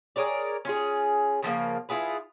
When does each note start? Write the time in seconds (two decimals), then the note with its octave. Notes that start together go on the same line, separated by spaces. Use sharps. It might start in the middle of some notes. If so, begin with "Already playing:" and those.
0.16 G#4 A#4 C#5 D5
0.65 C#4 F4 G#4
1.43 C#3 F3 G3 A#3
1.89 E4 F4 G#4 B4